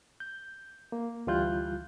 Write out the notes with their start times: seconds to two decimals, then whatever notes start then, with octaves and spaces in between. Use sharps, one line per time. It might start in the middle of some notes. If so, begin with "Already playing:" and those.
0.20 G6
0.92 A#3
1.27 D2 E3 G3 F4 F#6 G6